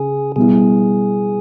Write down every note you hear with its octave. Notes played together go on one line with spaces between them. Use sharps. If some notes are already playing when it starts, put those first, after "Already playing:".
Already playing: C#3 G#4
B2 G3 B3 E4 G#4